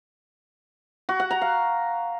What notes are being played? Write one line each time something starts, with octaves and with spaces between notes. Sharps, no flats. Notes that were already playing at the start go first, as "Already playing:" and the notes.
F#4
F#5
A#5
F5